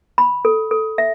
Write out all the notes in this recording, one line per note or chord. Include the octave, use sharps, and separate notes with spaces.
B5
A4
A4
E5